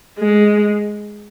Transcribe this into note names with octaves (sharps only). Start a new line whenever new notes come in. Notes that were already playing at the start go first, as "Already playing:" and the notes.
G#3